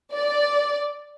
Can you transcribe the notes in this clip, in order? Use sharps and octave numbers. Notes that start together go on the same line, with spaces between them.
D5